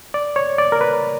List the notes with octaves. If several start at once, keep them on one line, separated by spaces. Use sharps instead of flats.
D5
C#5
D5
A#4
B4